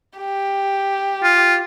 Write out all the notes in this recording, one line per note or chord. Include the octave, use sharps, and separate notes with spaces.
G4
F4